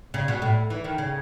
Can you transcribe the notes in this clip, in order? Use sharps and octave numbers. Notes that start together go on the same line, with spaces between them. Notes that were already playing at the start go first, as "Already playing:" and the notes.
C#3
B2
A2
E3
D#3
C#3